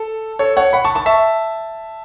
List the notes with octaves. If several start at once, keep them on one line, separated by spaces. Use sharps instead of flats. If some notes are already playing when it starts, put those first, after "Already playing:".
Already playing: A4
A4 C#5
C#5 F#5
F#5 B5
A5 C#6
A5 C#6
E5 A5